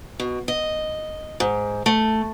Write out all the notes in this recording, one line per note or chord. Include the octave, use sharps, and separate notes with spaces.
B2
D#5
G#2
A3